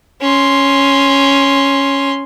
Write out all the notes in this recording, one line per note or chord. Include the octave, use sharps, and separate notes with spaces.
C#4 C6